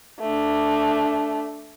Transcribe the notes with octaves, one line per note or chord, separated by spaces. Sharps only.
A3 D4